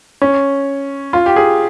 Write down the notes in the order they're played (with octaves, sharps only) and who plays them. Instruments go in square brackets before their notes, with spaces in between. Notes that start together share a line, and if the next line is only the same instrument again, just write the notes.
[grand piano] C#4
F4
G4
G#4